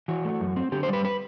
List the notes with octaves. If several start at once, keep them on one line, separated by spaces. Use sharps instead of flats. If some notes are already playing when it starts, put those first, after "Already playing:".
E3 F#4
A3
F#2
C4
D3 G4
C5
G3 B4
B4